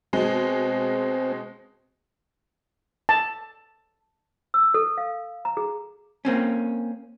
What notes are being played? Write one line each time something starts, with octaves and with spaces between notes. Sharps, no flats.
B2 G#3 C4
A5
E6
A4
F5
A#5
G#4
A#3 C4 C#4